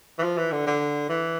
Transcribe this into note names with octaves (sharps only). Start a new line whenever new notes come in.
E3
F3
E3
D3
D3
E3